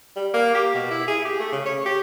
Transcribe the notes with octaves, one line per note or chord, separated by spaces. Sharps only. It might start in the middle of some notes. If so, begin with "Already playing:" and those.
G3
A#3
G4
B2
E4
G#4
G4
A3
C#3
C#5
G4